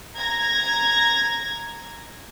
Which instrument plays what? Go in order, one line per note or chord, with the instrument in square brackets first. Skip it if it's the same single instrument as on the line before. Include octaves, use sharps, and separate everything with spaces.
[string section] A#5 G#6 A#6